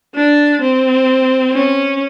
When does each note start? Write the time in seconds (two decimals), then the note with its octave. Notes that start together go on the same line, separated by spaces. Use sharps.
0.15 D4
0.61 C4
1.52 C#4